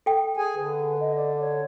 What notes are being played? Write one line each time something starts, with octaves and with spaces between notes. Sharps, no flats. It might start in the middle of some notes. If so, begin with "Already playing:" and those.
A4 G5
G#4 G#5
D3 B4
D#5
D5
C#5